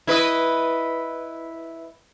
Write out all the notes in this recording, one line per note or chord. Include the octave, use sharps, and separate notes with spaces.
E4 B4 D#5